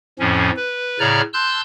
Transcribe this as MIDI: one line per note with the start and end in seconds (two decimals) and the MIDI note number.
0.19 0.51 41
0.19 0.51 45
0.19 0.51 53
0.19 0.51 61
0.56 0.99 71
1.00 1.21 45
1.00 1.21 49
1.00 1.21 73
1.00 1.21 74
1.00 1.21 82
1.00 1.21 89
1.34 1.61 81
1.34 1.61 84
1.34 1.61 88
1.34 1.61 90
1.34 1.61 91